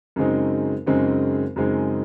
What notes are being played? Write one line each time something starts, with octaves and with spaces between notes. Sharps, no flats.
F#2 C#3 G#3 C4 D#4
F#2 C#3 G#3 C4 D#4
F#2 C#3 G#3 C4 D#4